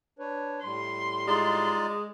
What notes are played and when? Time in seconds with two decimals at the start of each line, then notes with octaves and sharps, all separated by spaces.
0.19 D4 B4 C#5
0.64 A2 G3 C6
1.28 G#3 D#4 F4 D5